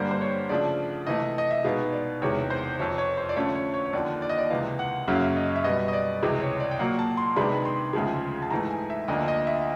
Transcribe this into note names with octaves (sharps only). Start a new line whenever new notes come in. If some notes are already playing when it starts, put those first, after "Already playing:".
Already playing: G2 D3 G3 A#3 C5
C5
C#5
C#3 F3 A3 D4 D5
C3 E3 A3 D#5
D#5
E5
B2 G#3 B3 D#4 F5
D5
E2 C3 D#3 G#3 C#5
C5
F2 C3 F3 C#5
C#5
C5
D5
D3 F3 A3 C#4 C#5
C#5
C#5
C#5
D#2 D3 F3 D5
D5
D#5
D5
C#2 C3 E3 F5
F#5
F#2 C#3 F#3 A#3 C#4 E5
F5
E5
D#5
E5
B2 G3 B3 D#5
D#5
D5
C#2 C3 E3 G#3
C#5
D5
G5
A#2 F#3 A#3 F#5
A5
C6
C3 D#3 G#3 B3 D4 B5
C6
D2 C#3 F3 G#3
A5
G#2 E3 A3 A#5
G#5
E5
D2 D3 F3 A#3 D#5
D#5
E5